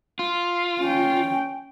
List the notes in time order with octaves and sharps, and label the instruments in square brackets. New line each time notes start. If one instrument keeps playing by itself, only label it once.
[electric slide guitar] F4
[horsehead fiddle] C#4 G5